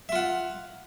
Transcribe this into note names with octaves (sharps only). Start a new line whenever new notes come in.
F4 E5 F#5